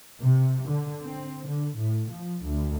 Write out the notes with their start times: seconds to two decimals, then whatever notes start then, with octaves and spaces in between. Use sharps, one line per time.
0.22 C3
0.68 D3
1.03 C4
1.48 D3
1.78 A2
2.11 F3
2.44 D2